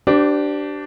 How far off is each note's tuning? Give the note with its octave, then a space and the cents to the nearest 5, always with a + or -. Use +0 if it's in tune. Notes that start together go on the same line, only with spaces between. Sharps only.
D4 +0 G4 -25 C5 -35